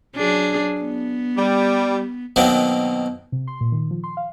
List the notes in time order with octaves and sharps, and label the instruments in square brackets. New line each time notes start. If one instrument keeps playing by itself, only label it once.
[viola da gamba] F#3 D4 G#4
B3
[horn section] G3
[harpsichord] B2 D#3 F#3 A#3 C4
[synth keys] C3
C6
A#2
D#3
F3
C6
F5